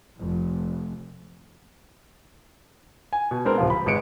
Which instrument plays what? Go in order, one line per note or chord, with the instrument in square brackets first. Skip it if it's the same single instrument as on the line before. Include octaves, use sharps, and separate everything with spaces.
[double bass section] F1 F2
[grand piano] G#5
B2
G#3 B3 C4 D4 A#4
D1 C3 F3 F4
B5
G#1 G#3 B4 C#7 D7